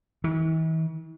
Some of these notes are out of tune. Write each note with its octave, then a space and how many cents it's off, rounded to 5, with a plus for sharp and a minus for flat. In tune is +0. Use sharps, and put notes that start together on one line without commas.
E3 -45